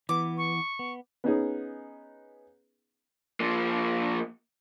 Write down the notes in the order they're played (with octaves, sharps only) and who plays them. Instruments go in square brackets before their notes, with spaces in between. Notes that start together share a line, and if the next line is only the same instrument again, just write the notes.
[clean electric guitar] E3 B3 [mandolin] D6
[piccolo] C#6
[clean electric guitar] B3
[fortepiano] B3 C#4 D#4 G#4
[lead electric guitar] F3 A#3